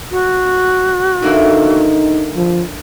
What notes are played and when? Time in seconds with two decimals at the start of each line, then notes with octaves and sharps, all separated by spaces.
0.11 F#4
1.22 D3 A#3 D#4 E4
2.36 F3